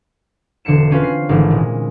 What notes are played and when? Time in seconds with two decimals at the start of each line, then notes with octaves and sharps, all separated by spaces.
0.65 E1 D3 C7 C#7 E7
0.90 C4 C#4 F4 B4
1.04 C7
1.29 G#1 D3 E3 A3
1.51 A#2 G#3